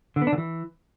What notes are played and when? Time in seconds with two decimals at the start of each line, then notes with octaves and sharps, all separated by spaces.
0.16 D3
0.22 B3
0.27 D4
0.32 D3
0.38 E3